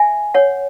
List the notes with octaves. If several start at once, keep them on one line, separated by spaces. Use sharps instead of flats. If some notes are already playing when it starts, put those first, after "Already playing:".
Already playing: E5 G#5
C#5 F#5